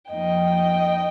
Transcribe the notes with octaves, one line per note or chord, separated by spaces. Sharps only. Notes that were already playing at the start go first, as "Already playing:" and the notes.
F2 F3 A#3 D#4 D#5 G5